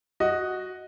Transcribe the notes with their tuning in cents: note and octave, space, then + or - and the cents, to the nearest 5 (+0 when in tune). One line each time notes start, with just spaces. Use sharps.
F#4 +0 D#5 +0